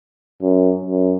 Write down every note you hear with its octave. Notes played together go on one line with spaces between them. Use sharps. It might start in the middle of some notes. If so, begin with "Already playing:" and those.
F#2
F#2